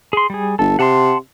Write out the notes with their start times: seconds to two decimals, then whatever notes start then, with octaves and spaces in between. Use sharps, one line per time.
0.13 G#4 C6
0.30 G3 G#4
0.59 G1 A4
0.79 C3 F#5 A5 C6